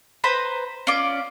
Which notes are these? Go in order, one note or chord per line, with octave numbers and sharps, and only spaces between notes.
B4 C5 A#5 B5
C#4 F4 D5 D6